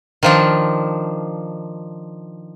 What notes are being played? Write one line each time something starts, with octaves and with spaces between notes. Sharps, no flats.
D#3 F3 D4